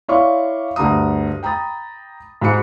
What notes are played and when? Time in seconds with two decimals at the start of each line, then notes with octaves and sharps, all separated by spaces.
0.08 E4 C#5 D5 F5 C6 C#6
0.76 D2 G2 A#5 D#6
1.43 G5 A#5 B5 D#6 A6
2.41 G#2 F#4 B5 C#7